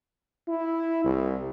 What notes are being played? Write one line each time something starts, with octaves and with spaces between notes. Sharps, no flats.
E4
C2